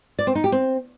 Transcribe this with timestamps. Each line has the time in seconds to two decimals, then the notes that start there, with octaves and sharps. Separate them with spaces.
0.19 D5
0.27 C4
0.35 D#4
0.44 G4
0.52 C4